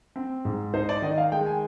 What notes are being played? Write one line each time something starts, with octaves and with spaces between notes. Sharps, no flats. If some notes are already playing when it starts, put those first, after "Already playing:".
C4
G#2
D#4 C5
D5
D#3 D#5
F5
G#3 G5
G#5